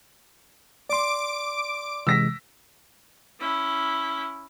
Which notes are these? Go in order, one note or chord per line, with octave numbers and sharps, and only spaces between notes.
D5 C6 D6 D7
C3 E3 G#3 E6 A#6 B6
C#4 E4